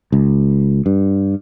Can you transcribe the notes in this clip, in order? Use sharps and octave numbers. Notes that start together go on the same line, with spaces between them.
C#2
G2